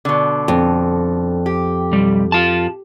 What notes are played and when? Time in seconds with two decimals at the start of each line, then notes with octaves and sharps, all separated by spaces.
0.05 B2 D3
0.48 F2
1.46 G4
1.91 B1 G3
2.32 F4 A5